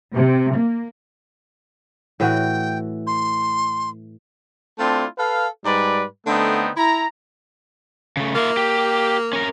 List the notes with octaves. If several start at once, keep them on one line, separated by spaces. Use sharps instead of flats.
C3
A#3
A2 E3 F#4 G5
C6
A3 C4 D4 E4 F4
A4 B4 F5
G#2 G3 B4 D5
D3 A3 B3 C4 D#4
E4 A#5
C#3 A3
A#3 F4 E5
G4
C#4 A#4